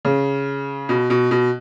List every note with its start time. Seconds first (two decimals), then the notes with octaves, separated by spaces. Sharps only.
0.05 C#3
0.89 B2
1.10 B2
1.31 B2